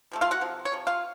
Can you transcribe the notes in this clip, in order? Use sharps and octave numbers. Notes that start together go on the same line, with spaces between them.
C3 F3 A3
F4 F5
F#4 F#5
C3 F3
C#5
C3 F3
F4 F5